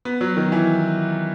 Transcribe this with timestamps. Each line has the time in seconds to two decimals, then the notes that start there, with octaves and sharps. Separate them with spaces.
0.05 B3
0.21 F#3
0.37 D#3
0.52 E3